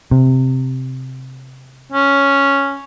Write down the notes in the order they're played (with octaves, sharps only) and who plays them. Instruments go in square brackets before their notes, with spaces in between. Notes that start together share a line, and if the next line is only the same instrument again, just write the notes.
[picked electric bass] C3
[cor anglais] C#4